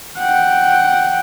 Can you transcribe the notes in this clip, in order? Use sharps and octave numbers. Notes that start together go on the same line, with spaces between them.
F#5 G5